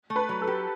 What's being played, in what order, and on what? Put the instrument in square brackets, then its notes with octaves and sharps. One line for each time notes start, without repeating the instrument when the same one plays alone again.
[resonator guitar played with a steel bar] A3
[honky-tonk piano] B4
[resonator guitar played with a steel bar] F#3
[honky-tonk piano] A4
[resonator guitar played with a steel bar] G4